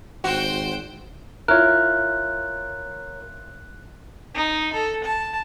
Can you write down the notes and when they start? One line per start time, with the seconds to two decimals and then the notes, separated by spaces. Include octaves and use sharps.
0.24 G#1 F#4 C5 G5
1.48 E4 F4 A#4 C#5 F#6
4.34 D#4
4.73 A4
5.04 A5